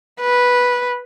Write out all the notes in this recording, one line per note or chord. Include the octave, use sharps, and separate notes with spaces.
B4